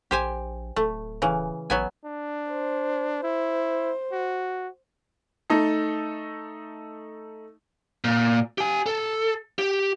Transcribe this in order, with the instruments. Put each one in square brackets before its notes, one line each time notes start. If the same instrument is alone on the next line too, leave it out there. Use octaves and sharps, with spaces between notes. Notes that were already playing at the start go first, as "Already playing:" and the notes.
[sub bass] A#1 [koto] G4 C5 G#5
[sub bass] D1 [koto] A3
[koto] C#3 E3
[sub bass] A1 [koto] F#3 B3 G#5
[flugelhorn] D4
[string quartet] C5
[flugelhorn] E4 [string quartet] C5
[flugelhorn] F#4
[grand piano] A3 D#4 A4
[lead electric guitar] A#2
G4 G#5
A4
G4